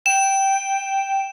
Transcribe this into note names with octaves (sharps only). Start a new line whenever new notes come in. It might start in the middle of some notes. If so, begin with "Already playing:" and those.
G5 E7